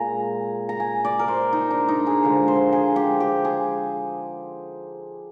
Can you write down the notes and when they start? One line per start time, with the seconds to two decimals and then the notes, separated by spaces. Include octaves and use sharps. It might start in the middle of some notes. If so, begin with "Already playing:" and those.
Already playing: A#2 G#3 G#5 A#5
0.69 A#5
0.80 G#5
1.05 D5
1.19 A#4
1.28 C5
1.53 D#4
1.71 D4
1.89 D#4
2.07 G#4
2.24 D3 F3 G#3
2.48 C5
2.73 G#4
2.96 G4
3.20 G4
3.45 G#4